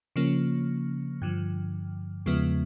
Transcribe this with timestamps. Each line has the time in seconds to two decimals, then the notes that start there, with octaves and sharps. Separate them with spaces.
0.16 C#3 F3 A#3 C#4
1.22 G2 D3 F3
2.26 E2 C#3 F3 G#3 B3